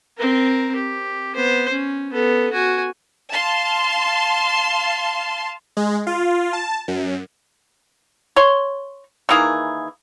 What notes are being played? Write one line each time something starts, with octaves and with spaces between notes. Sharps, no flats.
C4 A#4
G4
B3 C5
C#4
B3 A4
F#4 G#5
F5 A5 C6
G#3
F4
A5
F#2
C#5 C6
D#3 E3 A#3 G#4